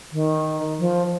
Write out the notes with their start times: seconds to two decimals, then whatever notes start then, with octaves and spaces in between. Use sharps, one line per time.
0.12 D#3
0.79 F3